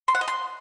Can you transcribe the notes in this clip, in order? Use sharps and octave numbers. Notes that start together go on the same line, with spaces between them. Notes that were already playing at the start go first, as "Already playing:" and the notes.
C6
F#5
D#5
C6